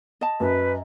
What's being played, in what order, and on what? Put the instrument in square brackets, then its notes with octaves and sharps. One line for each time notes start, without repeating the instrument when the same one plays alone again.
[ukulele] D#5 A5
[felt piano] F#2 [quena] B4